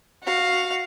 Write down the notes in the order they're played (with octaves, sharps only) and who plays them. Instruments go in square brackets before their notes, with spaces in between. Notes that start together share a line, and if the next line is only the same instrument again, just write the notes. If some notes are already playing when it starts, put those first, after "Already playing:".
[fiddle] F#4 F5